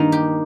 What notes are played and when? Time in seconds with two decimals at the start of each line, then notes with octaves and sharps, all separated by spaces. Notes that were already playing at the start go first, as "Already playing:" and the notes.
Already playing: G2 D#3 A#3 D#4
0.12 G4